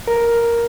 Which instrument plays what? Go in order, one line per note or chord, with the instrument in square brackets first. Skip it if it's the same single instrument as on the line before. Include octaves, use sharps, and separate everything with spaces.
[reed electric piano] A#4